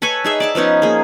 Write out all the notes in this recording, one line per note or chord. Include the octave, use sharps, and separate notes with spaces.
A4 B4 C#5 G#5
D#4 G#4 E5
D5 A5 D6
F3 B3 C#4 D#4
A#3 G#4